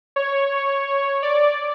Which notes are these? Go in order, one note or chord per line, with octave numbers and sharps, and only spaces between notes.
C#5
D5